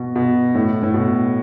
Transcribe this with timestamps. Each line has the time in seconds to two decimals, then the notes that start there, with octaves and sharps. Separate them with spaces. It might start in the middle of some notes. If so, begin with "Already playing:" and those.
Already playing: B2
0.16 B2
0.55 A2
0.83 A2
0.94 B2